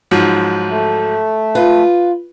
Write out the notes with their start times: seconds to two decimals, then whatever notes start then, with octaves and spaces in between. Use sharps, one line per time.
0.11 G#2 F3 F#3
0.68 A3
1.55 F4 B4